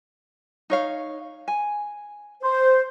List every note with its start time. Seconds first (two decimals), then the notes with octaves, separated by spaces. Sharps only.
0.70 D#4 C#5 F5
1.48 G#5
2.44 C5